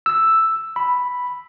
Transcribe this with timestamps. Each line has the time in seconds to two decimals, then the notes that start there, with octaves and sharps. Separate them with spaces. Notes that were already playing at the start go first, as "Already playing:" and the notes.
0.06 E6
0.76 B5